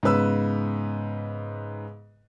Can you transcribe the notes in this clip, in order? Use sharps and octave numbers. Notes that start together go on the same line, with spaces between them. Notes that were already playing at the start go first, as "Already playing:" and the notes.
G#2 C#3 B3 B4 E6